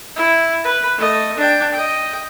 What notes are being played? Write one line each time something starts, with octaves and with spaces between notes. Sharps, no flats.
E4
B4
A3 D#5
D4 G5
D#5 G5